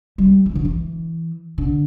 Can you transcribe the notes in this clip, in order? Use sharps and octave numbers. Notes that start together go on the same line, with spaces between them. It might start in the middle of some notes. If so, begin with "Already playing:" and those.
G3
E3
D3
E3
D3